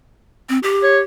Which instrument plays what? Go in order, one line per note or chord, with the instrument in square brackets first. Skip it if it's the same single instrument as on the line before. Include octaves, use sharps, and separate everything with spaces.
[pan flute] C4
G4
[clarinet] C#5